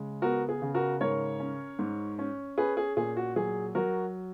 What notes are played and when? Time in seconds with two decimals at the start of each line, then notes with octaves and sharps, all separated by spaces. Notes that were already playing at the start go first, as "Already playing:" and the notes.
Already playing: C#3 G#3
0.22 B3 F#4 A#4
0.49 G#4
0.62 C#3
0.74 F#4 A#4
1.01 G#2 A#4 C#5
1.40 C#4
1.79 G#2
2.19 C#4
2.58 C#4 G#4 B4
2.77 G#4
2.97 A#2 G#4
3.17 F#4
3.36 F#3 G#4
3.75 F#3 F#4 A#4